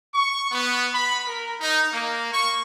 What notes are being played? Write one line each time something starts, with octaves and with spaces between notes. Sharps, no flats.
C#6
B3
B5
A#4
D#4
A#3
C#6